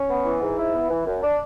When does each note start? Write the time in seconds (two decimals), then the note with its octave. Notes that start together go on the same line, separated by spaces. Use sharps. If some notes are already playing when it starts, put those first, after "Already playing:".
Already playing: C#4
0.10 B3
0.25 E3
0.42 G#2
0.57 E4
0.74 B3
0.90 E3
1.06 F#2
1.23 D4